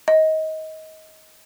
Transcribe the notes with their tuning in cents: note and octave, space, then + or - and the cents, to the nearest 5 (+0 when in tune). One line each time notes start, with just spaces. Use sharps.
D#5 +20